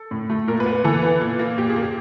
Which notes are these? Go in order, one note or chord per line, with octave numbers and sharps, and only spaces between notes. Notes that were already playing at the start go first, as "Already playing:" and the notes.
Already playing: A4
A2
A3
A#2 A#4
B4
B3
B4
E3 A4
B3
A#2
A#3
A#2 G4
G#4
A#3
G4